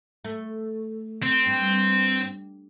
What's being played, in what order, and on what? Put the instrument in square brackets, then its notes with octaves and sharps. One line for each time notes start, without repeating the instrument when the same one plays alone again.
[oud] A3
[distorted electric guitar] C4
[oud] G2